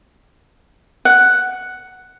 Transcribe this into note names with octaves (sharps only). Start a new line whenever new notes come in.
F#5